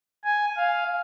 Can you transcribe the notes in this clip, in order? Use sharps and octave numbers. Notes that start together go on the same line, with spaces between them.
G#5
F5